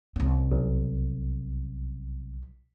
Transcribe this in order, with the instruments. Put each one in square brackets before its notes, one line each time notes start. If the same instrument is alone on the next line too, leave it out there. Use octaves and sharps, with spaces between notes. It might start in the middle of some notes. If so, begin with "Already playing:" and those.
[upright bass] C2 C#4
[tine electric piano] B1